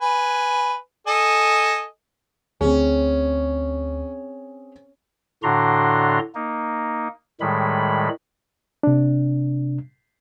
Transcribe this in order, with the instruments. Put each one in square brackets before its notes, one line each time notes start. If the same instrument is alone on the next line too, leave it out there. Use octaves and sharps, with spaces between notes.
[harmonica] B4 G#5
A4 D#5 G#5
[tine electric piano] D2 [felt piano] C4 G#4 [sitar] C#4
[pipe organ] A2 D3 D4 F#4 A#5 C6
A#3 D#4
A2 D#3 G3 G#3 B5
[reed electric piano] C3 D4